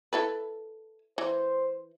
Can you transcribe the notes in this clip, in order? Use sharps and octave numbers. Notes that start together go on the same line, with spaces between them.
E4 A4 B4
E3 C5